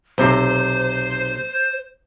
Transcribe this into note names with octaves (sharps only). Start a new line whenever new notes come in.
B1 C3 C5